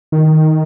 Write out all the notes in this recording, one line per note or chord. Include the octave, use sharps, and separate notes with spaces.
D#3